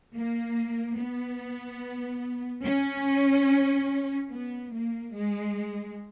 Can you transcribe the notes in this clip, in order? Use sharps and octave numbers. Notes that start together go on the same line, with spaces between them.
A#3
B3
C#4
B3
A#3
G#3